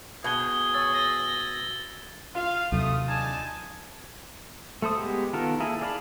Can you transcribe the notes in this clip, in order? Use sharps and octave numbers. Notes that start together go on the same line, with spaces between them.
B2 G#4 G#6 G7
C#5 E6 A6
A#6 G7
F4 F5
D#2 C3 F#3 A3 D#6
D3 D#4 G#5 A5
A3 A4 C5 D#6
G#3 B3 G4
D#3 B3 F4 A4 A#4
A#3 E4 G#4 A4
G#4 D5 F5 A5 B5